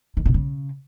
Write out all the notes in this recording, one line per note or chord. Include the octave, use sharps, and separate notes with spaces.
D#3
C3
C#3